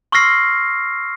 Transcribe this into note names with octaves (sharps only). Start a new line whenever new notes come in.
C6 C#6 E6 F6 A#6 C7